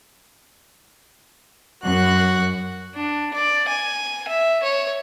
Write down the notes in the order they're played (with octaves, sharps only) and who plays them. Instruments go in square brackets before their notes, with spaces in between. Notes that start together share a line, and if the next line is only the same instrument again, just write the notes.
[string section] F#2 F#6 [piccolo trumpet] F#4
[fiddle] D4
D5
G#5
E5
C#5